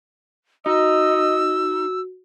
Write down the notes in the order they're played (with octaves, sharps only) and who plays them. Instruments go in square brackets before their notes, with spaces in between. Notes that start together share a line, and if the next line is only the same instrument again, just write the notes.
[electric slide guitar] D#4 [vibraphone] F#4 [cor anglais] D#5 [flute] E6